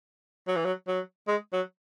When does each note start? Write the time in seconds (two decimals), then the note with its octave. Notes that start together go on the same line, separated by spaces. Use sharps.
0.48 F#3
0.56 E3
0.65 F#3
0.88 F#3
1.28 G#3
1.53 F#3